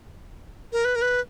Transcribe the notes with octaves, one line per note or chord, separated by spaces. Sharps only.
A#4
B4
A#4
B4